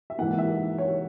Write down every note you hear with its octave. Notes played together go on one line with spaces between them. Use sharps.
E5
G#2 E3 A#3 F#5
E5
C#5